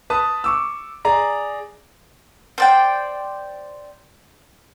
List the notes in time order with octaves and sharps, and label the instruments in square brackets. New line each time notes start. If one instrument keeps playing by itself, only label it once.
[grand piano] B4 A5 D#6
C#6 D6 E6
G#4 D5 A#5
[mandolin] C5 D5 G5